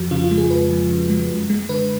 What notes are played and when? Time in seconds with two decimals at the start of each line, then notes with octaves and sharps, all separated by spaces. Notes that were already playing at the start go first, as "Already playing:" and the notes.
Already playing: F2 F3 F#4
0.11 C#3 F4
0.24 F4
0.31 G#3
0.38 G#4
0.50 F2 B4
0.70 F3
0.91 C#3
1.10 G#3
1.30 F#2
1.50 G#3
1.69 D3 B4